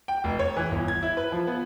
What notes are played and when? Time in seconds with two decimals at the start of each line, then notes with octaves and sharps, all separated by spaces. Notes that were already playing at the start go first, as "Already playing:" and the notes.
0.08 G5
0.24 F1
0.39 C#5
0.56 E3
0.71 G1
0.88 G#6
1.03 E4
1.17 B4
1.32 F3
1.47 B3